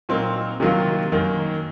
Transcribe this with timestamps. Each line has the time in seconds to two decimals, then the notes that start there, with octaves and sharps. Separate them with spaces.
0.09 A#2 F#3 C4 D#4 A#4
0.60 C3 D#3 F#3 A#3 F4
1.12 F#2 D#3 A#3